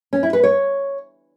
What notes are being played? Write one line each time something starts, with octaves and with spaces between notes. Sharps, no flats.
C#4
E4
B4
C#5